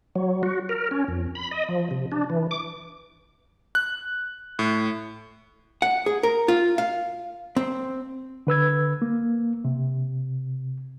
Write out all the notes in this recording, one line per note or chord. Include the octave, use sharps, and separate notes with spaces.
F#3
F#4
A#4
C#4
F2
B5
D#5
F3
C3
D4
E3
D6
F#6
A2
F#5
G#4
A#4
F4
F5
C4
D3 B4 E6 G#6
A#3
C3